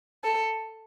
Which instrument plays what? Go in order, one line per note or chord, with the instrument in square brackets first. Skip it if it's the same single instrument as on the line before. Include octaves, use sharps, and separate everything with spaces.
[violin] A4